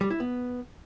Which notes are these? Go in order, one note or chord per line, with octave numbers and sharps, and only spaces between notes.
G3
E4
B3